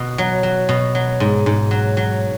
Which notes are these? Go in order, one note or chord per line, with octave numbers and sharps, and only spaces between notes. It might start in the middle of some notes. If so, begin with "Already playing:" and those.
Already playing: B2
F#3
F#3
B2
F#3
G#2
G#2
F#3
F#3